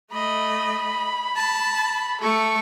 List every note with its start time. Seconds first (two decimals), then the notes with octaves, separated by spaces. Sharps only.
0.13 A3 D#5 B5
1.36 A5
2.21 A3 A4 C#6